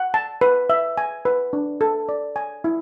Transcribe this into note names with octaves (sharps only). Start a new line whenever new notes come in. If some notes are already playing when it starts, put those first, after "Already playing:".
Already playing: F#5
A5
B4
E5
G#5
B4
D4
A4
D5
G#5
E4